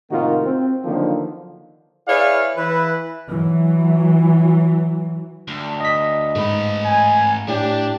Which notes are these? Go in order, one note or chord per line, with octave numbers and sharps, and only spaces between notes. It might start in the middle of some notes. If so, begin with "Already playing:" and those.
A2 C3 D#3 A#3 F4 F#4
C4
D3 D#3 F3 F#3 A#3 B3
E4 G#4 B4 C#5 D5 F5
E3 B4
E3 F#3
D2
D#5 B6
G#2 A3 B4
G#5
A2 D4 G4